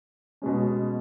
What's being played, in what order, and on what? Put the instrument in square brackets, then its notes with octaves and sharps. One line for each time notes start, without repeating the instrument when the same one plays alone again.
[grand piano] B2 G#3 C#4